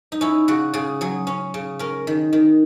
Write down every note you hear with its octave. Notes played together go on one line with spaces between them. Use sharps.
D#4
C#4 E4
C#3 F#4
C#3 G#4
F#3 G#4
C#4
C#3
C#4 A#4
D#3
D#3